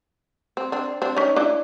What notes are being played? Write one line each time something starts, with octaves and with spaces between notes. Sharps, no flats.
C4
C4 D4
C4 D4
C#4 D#4
D4 E4